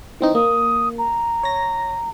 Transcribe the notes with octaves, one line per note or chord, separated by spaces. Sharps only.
E3 C4 D#4
A#3 D#6
A#5
C#5 A#6